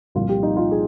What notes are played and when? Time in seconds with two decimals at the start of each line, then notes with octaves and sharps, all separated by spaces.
0.15 C2 A#2 F3 F4
0.29 G4
0.43 D#4
0.57 F4
0.71 G#4